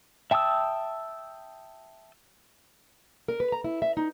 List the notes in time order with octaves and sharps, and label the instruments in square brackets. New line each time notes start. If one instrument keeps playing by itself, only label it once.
[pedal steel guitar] E5 G5 A5 D#6 E6
[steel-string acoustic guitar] A#4
B4
A#5
E4
E5
D#4